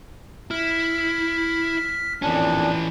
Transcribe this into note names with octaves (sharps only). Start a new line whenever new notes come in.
E4 F6 B6
F2 A#2 E3 C#4 D4